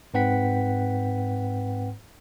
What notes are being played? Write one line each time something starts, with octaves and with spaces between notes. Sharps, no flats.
G#2 C4 B4 F#5 G5 B6